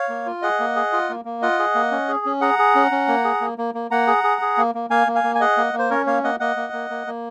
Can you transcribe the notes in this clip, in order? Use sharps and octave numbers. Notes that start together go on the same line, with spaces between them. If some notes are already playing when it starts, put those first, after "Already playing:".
Already playing: C#5 F5
A#3
F4
G#4 D#5 F#5
A#3
G#4
F4
A#3
A#3
F4 D#5 F#5
G#4
A#3
C#4
G#4
C#4
G#4 F#5 A#5
G#4
C#4
C#4
A#3
G#4
A#3
A#3
A#3
A#3 F#5 A#5
G#4
G#4
G#4
A#3
A#3
A#3 F5 G#5
A#3
F5 G#5
A#3
G#5
G#4 D#5 F#5
A#3
A#3
C5
C#4 A#4 C#5
A#3 C#5 F5
A#3 D#5 F#5
A#3 D#5 F#5
A#3
A#3
A#3
A#3